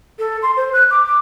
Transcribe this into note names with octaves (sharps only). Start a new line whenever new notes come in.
A4
C6
C5
F#6
D6
D6